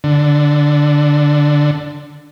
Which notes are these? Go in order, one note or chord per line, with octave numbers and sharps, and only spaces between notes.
D3